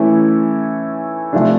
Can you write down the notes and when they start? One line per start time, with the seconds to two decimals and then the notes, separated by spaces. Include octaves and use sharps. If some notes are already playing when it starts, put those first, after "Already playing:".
Already playing: E3 A3 C#4 E4
1.33 C3 F3 A3 D4